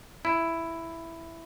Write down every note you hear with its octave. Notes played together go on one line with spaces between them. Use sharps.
E4